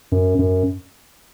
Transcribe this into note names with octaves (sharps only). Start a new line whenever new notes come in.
F#2
F#2